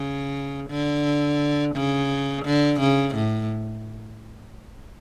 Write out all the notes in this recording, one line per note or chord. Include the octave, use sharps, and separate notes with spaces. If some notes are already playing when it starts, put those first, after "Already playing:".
Already playing: C#3
D3
C#3
D3
C#3
A2